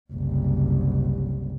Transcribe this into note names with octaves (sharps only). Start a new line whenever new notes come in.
F#1 C2